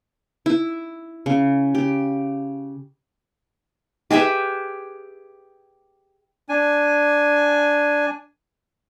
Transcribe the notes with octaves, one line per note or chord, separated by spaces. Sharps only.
E4
C#3
G4
G4 G#4 B4 E5
D4 G#5